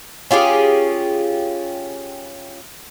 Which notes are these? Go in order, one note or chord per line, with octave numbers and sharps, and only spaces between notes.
C#4 F4 G4 G#4